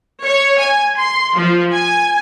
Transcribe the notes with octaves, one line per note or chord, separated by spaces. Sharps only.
C#5
G#5
C6
F3
G#5